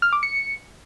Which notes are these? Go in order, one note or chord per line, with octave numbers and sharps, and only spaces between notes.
F6
D6
C#7